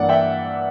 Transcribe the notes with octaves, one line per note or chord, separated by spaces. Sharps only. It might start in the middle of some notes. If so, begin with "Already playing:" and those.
Already playing: G2 E3 A#3 D5 F#5
E5 G5